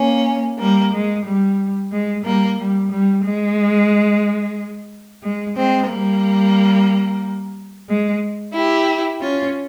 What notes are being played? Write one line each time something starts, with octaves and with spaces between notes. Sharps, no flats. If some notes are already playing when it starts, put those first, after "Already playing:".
Already playing: A#3 C#4
G3 A#3
G#3
G3
G#3
G3 A#3
G3
G3
G#3
G#3
G#3 C4
G3 A#3
G#3
E4 G4
C#4 F4